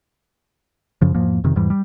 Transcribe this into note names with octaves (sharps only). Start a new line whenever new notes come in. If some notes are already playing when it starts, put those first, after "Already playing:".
F#2 C#3 F3
E2 G#2 F3 A#3
F2 C3 D#3
E2 G#2 E3 G3
G3